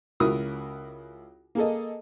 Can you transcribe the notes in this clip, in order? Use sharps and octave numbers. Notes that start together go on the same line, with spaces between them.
C#2 E4 F#4 A#4 D#6
A#3 G#4 A4 D#5